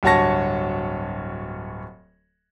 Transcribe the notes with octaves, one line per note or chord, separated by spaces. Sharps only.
D1 G2 F#4 C#5 A5 A#6